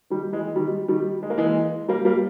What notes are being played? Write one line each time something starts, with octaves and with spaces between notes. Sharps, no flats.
D#3 G3
E3 G#3
D#3 G3
D#3 G3
G#3
A#3
E3 G#3
G3 A#3
G3 A#3